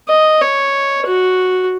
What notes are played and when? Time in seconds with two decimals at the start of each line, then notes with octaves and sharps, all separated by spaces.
0.08 D#5
0.41 C#5
1.06 F#4